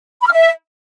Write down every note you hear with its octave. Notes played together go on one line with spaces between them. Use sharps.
B5
F6
E5